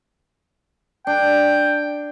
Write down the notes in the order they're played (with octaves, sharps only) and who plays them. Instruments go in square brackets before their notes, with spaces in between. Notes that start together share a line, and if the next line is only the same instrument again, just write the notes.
[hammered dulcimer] D4 [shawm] G5